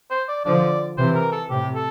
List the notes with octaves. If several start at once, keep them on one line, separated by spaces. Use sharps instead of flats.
C5
D5
D3 F3 D5
C3 E3 C5
A#4
A4
A2 C3 G4
A4